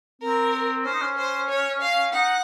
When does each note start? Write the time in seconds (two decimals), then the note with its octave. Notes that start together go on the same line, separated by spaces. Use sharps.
0.22 C4 A#4
0.85 C#4 C5
0.93 D#4
1.01 C#4
1.17 C5
1.49 C#5
1.81 F5
2.13 D#4 F#5